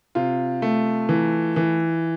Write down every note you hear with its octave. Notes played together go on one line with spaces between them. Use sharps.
C3 F4
A3
E3
E3